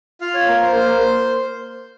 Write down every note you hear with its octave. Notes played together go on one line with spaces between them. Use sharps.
F4 F5
C#5
A#3 A#4
C5
A#3